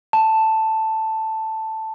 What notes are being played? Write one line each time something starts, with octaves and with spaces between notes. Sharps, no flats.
A5